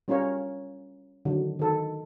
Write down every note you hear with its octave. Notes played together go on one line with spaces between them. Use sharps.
G3 C#4 F4 A#4 C#5
D3 D#3 F#3
D#3 A4